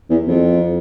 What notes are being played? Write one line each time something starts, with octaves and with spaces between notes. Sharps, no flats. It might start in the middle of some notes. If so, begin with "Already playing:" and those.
E2
F2